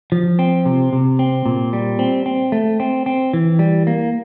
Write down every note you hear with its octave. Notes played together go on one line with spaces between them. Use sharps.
F3
C4
C3
C3
C4
A#2
G3
C4
C4
A3
C4
C4
E3
G3
A#3